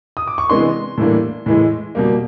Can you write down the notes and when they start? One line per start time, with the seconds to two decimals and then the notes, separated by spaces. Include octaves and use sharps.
0.17 D#6
0.27 D6
0.38 C#6
0.49 C3 E3 G#3 B3 D4 C6
0.98 A2 E3 G3 A#3 D4
1.46 A2 E3 G#3
1.95 B2 G3 A#3